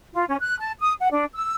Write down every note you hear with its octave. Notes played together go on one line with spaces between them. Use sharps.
F4
C#4
F#6
A5
D#6
F#5
D4
E6